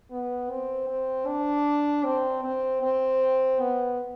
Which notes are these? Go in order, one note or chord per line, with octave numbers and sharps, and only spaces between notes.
B3
C4
C4
D4
C4
C4
C4
B3